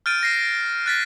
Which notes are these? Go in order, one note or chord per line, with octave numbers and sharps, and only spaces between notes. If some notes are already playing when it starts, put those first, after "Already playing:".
F6 G6 A6 D7 D#7
A#6 C7 E7
F#6 A6 B6